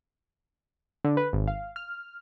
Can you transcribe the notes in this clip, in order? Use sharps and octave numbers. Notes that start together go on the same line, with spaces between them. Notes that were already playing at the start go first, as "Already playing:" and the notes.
D3
B4
G#1
F5
F6